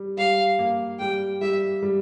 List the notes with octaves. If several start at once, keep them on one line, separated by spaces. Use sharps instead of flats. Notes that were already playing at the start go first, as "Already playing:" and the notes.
Already playing: G3
G3 F5
A#3
G3 G5
G3 E5
G3